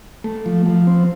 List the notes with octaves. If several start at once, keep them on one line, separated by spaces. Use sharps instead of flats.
A3
F3
F3
C4